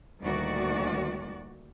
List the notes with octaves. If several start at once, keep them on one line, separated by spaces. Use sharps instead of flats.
D2 A#2 D#3 G3 F#4 D5